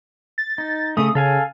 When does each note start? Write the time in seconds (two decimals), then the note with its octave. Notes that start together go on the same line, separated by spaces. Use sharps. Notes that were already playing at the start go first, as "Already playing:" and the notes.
0.38 A6
0.58 D#4
0.97 C#3 A3 D#6
1.15 C#3 A4 F5 G#5